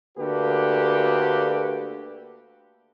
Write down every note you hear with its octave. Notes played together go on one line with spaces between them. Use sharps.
D2 D3 A#3 F#4 G4 B4